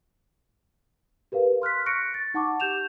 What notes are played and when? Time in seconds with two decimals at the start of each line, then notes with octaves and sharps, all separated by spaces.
1.32 G4 A#4 B4 F5
1.62 C6 F6 F#6 B6
1.86 C#6 F#6 A#6 C#7 D7
2.14 A6
2.34 D#4 F#5 A5 C#6 D6
2.60 G4 G6 E7 F7